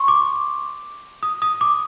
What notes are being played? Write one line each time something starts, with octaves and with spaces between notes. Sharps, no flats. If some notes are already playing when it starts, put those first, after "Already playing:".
Already playing: C6 C#6
D6
D#6
D#6
D6